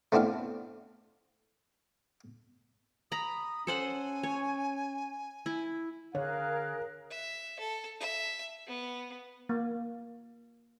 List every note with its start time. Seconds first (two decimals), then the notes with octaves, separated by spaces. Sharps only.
0.12 A3 B3 C4 D4 E4 F5
3.12 A#5 B5 D#6
3.67 C#4 A4 C5 F#5 G#5
4.23 C#5
5.46 E4
6.15 D3 G#4 A#4 C#5 F5 F#6
7.11 E5
7.59 A4
8.00 E5
8.67 B3
9.49 A#3